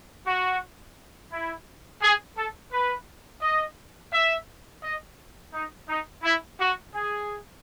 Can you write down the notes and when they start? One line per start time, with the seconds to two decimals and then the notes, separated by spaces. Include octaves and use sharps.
0.25 F#4
1.31 E4
2.02 G#4
2.36 A4
2.72 B4
3.41 D#5
4.12 E5
4.83 D#5
5.53 D#4
5.88 D#4
6.23 E4
6.59 F#4
6.94 G#4